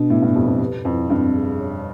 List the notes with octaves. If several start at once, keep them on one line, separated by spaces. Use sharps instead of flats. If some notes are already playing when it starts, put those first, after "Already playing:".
Already playing: B2 D4
A2 B3
G2
F2 G4
F2
B4
F2 E4
G2 C4
G#4
C#5